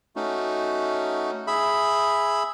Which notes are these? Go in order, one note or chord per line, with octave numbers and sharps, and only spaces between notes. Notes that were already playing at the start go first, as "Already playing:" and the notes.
A3 C#4 D#4 F#4
G#4 E5 B5